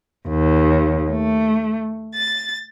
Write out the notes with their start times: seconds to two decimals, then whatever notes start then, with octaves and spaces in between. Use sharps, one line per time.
0.27 D#2
1.11 A3
2.14 A6